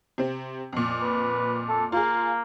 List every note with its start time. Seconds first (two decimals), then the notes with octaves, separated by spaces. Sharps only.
0.18 C3 C4
0.72 F2 A#2
1.02 B4
1.69 A4
1.92 A#3 F4 G#4